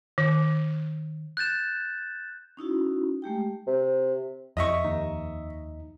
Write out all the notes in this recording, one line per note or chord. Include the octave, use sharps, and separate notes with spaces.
D#3
F#6 G6 A6 E7
C#4 D#4 E4 F#4
G#3 A3 G4 G5
C3
F2 D#5 E5 C#6
D#2 D#4